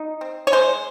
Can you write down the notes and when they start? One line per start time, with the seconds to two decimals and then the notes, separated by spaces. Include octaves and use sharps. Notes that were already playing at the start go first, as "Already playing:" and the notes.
Already playing: D#4
0.21 C4
0.47 C#5
0.52 G#3 C5